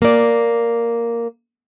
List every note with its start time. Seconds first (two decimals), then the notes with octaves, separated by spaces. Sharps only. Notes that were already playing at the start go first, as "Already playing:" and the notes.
0.02 A#3 D5